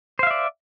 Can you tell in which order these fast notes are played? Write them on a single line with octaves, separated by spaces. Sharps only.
C5 F5 E5 D5